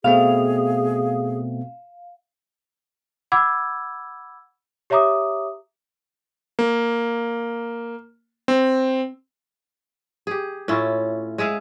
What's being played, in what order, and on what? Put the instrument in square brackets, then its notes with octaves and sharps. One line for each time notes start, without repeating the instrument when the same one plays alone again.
[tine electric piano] B2 A3 C4 [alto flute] G#4 [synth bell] F5
[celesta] F#5 B5 D6 E6 G#6
G4 C#5 E5 A#5 D6 D#6
[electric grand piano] A#3
C4
[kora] G4 G#4
A2 C#4 E4 F4
G#3 G#4 E5 F5